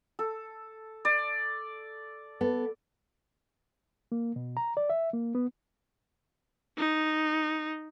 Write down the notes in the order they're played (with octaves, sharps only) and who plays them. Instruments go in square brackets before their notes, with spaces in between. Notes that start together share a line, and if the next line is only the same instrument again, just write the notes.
[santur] A4
D5
[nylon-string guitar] B3 A4
[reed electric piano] A#3
B2
A#5
D5
E5
A#3
B3
[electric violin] D#4